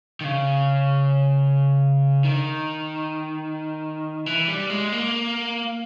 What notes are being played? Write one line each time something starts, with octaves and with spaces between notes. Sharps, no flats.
D#3
C#3
D#3
E3
G3
G#3
A#3